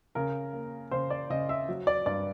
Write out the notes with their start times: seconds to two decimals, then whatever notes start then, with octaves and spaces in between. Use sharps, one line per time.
0.15 C#3 A#4
0.53 A#3
0.91 C#3 C5
1.10 D5
1.30 C#3 D#5
1.49 E5
1.68 F#3
1.87 D5
2.06 G2 D5